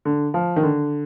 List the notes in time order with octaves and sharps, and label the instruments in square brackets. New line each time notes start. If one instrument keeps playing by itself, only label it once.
[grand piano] D3
F3
D#3
D3